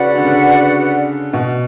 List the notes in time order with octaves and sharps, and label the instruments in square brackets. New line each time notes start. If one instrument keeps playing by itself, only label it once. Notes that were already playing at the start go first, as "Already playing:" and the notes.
Already playing: [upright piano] C#3 [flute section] F#4 B4 D5 F#5
[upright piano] D3
C#3
B2